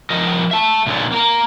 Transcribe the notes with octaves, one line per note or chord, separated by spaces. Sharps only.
F3 A#4 D#5
E5 A5
A#2 D3 D#3 C#4 F4
A#3 A#4